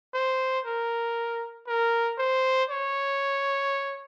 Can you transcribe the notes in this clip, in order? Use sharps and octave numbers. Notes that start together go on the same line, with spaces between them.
C5
A#4
A#4
C5
C#5